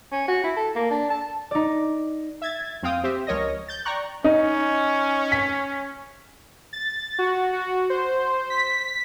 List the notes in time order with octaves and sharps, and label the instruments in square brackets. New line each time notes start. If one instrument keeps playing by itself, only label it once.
[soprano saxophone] C#4
F#4
E4
A4
A#3
D4
A5
[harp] D#4 D5
[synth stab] E5 G#6 A6
F2 C4 F5 G5 D#6
C4 G4 C5 E5
C#2 F3 A#4 C#5 D#5 A#6
G6 A6
D5 G5 A#5 C#6 F#6
[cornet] C#4 [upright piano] D#4
[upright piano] B6
[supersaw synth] A6
F#4
F#4
C5
B6